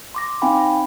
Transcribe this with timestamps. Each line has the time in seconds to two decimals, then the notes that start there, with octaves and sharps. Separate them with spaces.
0.15 C6 D6 A#6
0.42 C4 D#4 F5 G5 G#5 B5